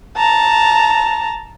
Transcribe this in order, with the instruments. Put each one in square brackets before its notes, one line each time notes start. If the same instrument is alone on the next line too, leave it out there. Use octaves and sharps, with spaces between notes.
[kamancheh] A5 A#5